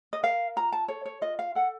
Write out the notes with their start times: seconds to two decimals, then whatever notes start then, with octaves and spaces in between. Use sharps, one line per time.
0.13 D#5
0.23 A#4 F5
0.56 F4 A#5
0.72 A5
0.88 A4 C#5
1.06 C#5
1.21 F4 D#5
1.39 F5
1.55 A4 F#5